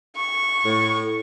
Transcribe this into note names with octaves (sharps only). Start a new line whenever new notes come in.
C#6
A2